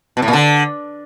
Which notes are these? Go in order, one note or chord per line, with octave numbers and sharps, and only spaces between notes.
B2
A2
A#2
D3